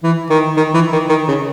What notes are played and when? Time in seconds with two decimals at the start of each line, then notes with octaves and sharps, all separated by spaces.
0.03 E3
0.30 D#3
0.57 D#3
0.74 E3
0.92 D#3
1.09 D#3
1.28 C#3